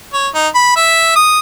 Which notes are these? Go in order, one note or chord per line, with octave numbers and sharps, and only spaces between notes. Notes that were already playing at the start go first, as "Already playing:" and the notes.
C#5
D#4
B5
E5
D#6